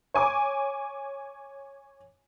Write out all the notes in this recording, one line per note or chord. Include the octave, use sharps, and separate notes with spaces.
C#5 G#5 D6